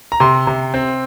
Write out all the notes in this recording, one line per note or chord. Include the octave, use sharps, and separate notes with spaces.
A#5
C3 C6
C3
C4